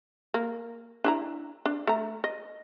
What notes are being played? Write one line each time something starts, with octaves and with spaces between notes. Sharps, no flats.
A#3
D4 E4 A#5
D4
A3 A#5
D#5